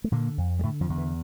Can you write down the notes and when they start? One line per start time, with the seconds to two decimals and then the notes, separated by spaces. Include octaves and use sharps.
0.04 A3
0.12 A#2 D3 A#3
0.38 F2
0.59 G3
0.63 A2 D3 A3
0.81 F2 F3
0.90 E2
0.98 E3